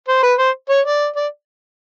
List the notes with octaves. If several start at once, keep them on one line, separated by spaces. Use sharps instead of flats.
C5
B4
C5
C#5
D5
D5